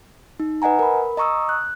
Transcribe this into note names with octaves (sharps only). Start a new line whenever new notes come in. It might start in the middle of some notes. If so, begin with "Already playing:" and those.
D#4
B4 D#5 F#5 G#5 A#5
A#4 B5
D#5 A#5 C#6 D#6 E6
F#6